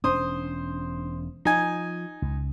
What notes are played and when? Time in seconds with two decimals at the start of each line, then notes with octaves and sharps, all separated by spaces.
0.04 E1 C#4 D4 C5 D#6
1.45 F3 D#4 G#5
2.22 C#2